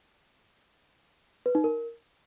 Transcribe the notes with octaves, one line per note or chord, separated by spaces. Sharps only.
B4
D#4
A#4